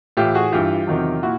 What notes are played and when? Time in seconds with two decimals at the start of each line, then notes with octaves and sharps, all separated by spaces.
0.17 A2 E3 F4 G4
0.35 F#4 G#4
0.52 G2 E3 F4 G4
0.87 E2 C3 D#3 F#3
1.23 A#2 E4 F#4